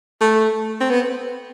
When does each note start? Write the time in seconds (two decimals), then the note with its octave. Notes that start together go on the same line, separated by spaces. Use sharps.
0.21 A3
0.80 C4
0.90 B3